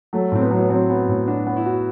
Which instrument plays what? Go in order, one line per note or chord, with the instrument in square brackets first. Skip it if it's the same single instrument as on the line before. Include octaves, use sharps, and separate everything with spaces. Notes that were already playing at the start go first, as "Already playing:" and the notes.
[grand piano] F#3 [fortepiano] A3
[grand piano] A2 [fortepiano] C4
[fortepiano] B3
[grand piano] F#3
[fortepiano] B3
[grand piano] F#3 [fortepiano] C4
[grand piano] B3
A2
[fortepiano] D4 [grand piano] F#4
[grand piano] B3
[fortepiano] E4
[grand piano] F#4